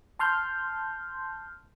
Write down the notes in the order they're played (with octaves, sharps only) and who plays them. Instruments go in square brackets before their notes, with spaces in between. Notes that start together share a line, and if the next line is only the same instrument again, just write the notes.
[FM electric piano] A5 C6 F6 G6